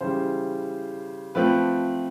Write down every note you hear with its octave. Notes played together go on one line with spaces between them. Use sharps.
C#3 E3 G3 C5
F3 A3 C4 B4